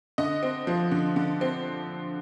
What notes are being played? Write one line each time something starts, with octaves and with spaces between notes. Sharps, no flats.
D3 D#5
C4
F3
D3
D3
C4